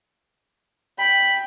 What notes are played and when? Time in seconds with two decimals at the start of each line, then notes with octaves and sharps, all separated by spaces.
0.99 G5 B5